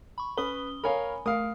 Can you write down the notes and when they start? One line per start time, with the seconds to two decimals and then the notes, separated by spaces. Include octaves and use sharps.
0.18 B5 C#6
0.37 C#4 B4 D#6 G7
0.84 A#4 C#5 F5 G#5 B5
1.26 A3 A#4 F5 D#6